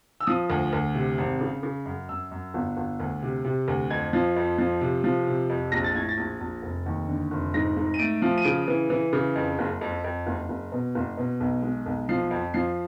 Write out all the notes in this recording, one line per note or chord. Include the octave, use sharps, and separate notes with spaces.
E6
F3 D#6
D2
D2
C3
G#1
C#3
C#3
F#2
F#2 E6
F#2
G1
G1
D2
C3
C3
D2
F2 G#6
F3
F2
F3
C3
F3
C3
F2
A#1 A#6
A6
A2 G#6
A6
A#1
A#1
F1
D#2
D3
F1
G#2 A#6
G#2
D#7
A3 D7
F3
D#7
C#3 D7
E3
E3
C#3
F2
F#1
F2
F2
F#1
F#1
B2
F#1
B2
B1
G#3
B1
F3 C7
F2
F3 C7